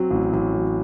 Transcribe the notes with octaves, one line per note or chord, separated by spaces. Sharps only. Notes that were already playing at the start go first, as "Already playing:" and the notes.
Already playing: F#3 C4
A1
A1
F#3